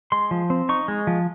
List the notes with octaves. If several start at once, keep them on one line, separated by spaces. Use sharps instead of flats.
G#3 C6
F3
C4
D#4 C#6
G#3
F3